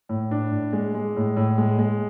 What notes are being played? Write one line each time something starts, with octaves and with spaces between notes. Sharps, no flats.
A2
D4
A2
G#3
G#3
A2
A2
G#3
G#3